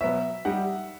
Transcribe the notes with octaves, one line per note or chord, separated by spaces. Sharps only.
B2 F#3 B3 E5
G3 D#4 G4 F#5